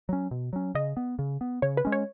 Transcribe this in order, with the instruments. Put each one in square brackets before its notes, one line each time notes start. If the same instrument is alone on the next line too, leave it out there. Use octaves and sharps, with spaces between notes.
[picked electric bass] F#3 C#4
B2
F#3 C#4
[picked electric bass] C#3 [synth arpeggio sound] D#5
[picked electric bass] B3
C#3
B3
[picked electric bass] C#3 [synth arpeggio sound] C#5
[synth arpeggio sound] B4
[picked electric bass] G#3 C#4
[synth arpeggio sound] C#5